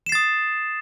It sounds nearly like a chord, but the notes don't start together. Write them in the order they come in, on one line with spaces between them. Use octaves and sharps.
E7 C7 A6 D#6